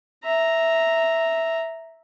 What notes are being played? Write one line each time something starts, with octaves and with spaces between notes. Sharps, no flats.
E5 A#5